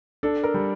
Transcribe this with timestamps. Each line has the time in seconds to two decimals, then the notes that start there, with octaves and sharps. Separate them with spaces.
0.23 D4 A4
0.44 A#4
0.54 G3